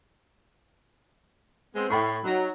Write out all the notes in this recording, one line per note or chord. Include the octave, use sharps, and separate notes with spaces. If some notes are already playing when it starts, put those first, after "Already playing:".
G#3 B3 C4
A2 G5 B5 C#6
F#3 D#4